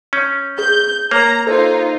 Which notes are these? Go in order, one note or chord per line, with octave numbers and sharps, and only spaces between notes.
C#4 G6
G#4 G6
A#3 C#5 A#5
D#4 F4 A4 C5